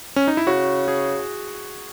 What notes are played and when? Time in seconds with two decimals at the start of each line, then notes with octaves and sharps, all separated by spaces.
0.16 C#4
0.28 D#4
0.37 E4
0.47 C#3 F#4
0.88 G#4